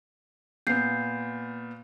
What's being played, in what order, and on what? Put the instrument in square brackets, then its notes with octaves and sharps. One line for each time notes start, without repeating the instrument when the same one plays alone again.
[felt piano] A#2 B3 [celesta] G6 C7